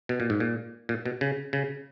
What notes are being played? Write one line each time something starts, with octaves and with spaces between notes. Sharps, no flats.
B2
A#2
G#2
A#2
A#2
B2
C#3
C#3